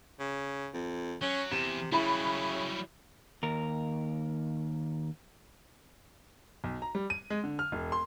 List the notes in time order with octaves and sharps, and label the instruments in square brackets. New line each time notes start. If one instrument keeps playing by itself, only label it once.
[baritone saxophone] C#3
F2
[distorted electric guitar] F#3 [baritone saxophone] C#4
[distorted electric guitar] E2 [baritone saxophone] C3 [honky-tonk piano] E7
[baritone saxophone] C#3 [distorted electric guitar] F#3 G3 [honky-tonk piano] E4 B5
[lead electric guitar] D#2 A#4
[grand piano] B1
A#5
G3
D#7
G#3
D3
F6
E1
C6